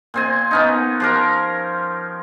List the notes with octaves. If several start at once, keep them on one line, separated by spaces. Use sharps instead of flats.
A#2 C4 G#5
B3 C#4 D#4
F3 G4 A#4